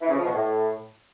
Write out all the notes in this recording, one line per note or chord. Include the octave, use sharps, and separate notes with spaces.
E3
C#3
F3
B2
A2